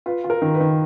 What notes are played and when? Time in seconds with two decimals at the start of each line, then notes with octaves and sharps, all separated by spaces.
0.06 F4 B4
0.24 F4
0.30 A#4
0.42 D#3
0.55 B4
0.60 D#3